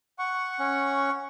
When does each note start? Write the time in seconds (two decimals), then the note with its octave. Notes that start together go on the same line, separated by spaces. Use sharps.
0.19 F#5 C#6
0.59 C#4